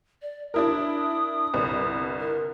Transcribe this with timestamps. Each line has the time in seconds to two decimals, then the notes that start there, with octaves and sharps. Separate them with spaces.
0.22 D5
0.54 D4 E4 A#4 D#6
1.54 G1 C2
2.20 A#4